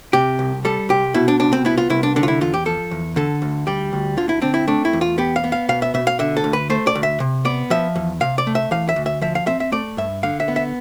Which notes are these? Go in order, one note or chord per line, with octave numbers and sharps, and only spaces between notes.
C3 G4
C2
G3 A4
C2 G4
B2 E4
D4
C2 D4
C4
B3 E4
F4
C2 E4
D4
D3 D4
F4
E4
E2 F4
G4
F3 A4
E2
D3 A4
D2
G3 G4
D2
D3 F4
E4
C4 D4
E4
A3 D4
E4
E2
F4
B3 G4
F5
B3
F5
B2 F5
E5
B2 E5
F5
D3 E5
A4
D2
B4
A3 C5
D5
D2
E5
C3
B3 D5
F3 E5
E2
C3 F5
D5
A3
E5
E3 F5
E5
D2
E5
F3 E5
F5
C4 E5
E5
A3 D5
G2 E5
D3 F5
E5
B3
E5